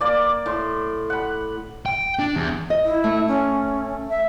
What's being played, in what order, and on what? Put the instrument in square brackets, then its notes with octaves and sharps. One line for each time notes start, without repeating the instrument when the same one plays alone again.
[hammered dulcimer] A#3 D5 D6
A2 C6
F#5 B5
[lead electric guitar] G5
D4
E2
[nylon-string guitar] D#5
[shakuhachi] E4
[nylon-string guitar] A3
[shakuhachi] C#4
E5